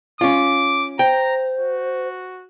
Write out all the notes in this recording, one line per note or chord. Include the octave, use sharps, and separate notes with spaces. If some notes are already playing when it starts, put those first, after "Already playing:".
C#4 F4 D6
C5 G5 A#5
F#4